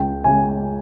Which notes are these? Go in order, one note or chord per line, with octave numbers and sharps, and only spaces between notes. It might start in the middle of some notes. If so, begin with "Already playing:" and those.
Already playing: C#2 G5
C#3 G#3 G#5